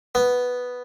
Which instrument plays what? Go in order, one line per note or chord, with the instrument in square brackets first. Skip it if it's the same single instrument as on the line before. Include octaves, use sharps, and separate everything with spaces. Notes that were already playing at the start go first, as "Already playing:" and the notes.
[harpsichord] B3